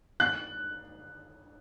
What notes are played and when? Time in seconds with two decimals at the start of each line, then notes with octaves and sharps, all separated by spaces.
0.20 F#6